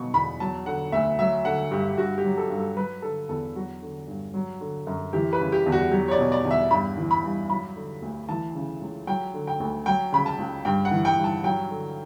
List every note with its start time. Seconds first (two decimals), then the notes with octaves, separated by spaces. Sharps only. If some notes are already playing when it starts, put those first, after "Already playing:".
Already playing: B2 F#3 C#6
0.14 E2 B5
0.40 F#3 A5
0.66 D3 F#5
0.92 D2 E5
1.19 F#3 E5
1.45 D3 F#5
1.71 G2 G4
1.97 G2 F#4
2.18 G4
2.24 F#3
2.37 A4
2.50 G2
2.57 A4
2.77 F#3 B4
3.02 D3 A4
3.29 E2 A4
3.55 F#3 F#4
3.82 D3
4.08 G2
4.34 F#3
4.61 D3
4.87 F#2
5.13 E3 G4
5.33 B4
5.40 C#3
5.52 G4
5.66 E2
5.72 F#4
5.91 F#3 G4
6.08 C#5
6.11 D5
6.19 B2
6.32 D5
6.44 E2
6.51 E5
6.71 G2 B5
6.97 E3
7.11 B5
7.24 G2
7.50 F#3 B5
7.76 D3
8.02 D2
8.29 E3 A5
8.55 C#3
8.82 C#2
9.07 F#3 G5
9.34 D3
9.47 G5
9.60 D2
9.86 F#3 G5
10.12 C#3 B5
10.26 A5
10.38 C#2
10.65 G2 G5
10.85 F#5
10.91 E3
11.05 G5
11.17 G2
11.24 A5
11.44 F#3 G5
11.71 D3